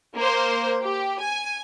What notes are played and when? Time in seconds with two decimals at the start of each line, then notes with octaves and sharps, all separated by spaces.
0.16 A#3 C5
0.82 G4
1.20 G#5